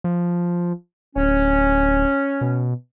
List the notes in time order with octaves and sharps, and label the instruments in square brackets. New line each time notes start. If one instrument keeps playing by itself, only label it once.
[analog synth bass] F3
[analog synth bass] D1 [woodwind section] C#4
[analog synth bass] B2